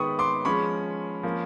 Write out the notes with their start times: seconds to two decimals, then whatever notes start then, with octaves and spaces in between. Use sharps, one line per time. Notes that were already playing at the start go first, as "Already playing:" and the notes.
Already playing: D#3 G#3 B3 B5 C#6 D#6
0.19 C6 D6
0.45 F3 G#3 C#4 B5 C#6
1.23 F3 A#3 C#4